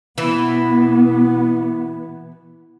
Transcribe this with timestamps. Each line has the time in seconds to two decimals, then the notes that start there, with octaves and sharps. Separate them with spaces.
0.18 B2 E3 B3